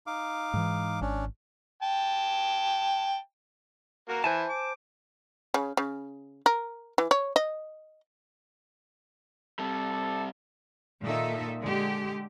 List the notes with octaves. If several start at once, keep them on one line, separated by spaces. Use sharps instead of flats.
D#4 F5 D6
G#2 E3
G#1 C#4 D4
G5 A5
A#3 F#4 A#4
E3 C5 E5 G#5 A5
D6
C#3
C#3
A#4
E3
C#5
D#5
C3 G3 A4
A#2 D#3 D#4 A4 E5
D3 G#3 G4